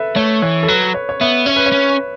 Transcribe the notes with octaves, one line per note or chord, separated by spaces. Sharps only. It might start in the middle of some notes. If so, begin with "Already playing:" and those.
Already playing: A4 B4 E5
A3 C#5
E3 C#5
A4
F#3 B4
C#5
C#5
B3 E5
C#4 C#5
B4
C#5
C#4